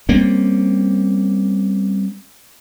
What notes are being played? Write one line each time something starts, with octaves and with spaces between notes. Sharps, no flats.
G3 A#3 C4 C#4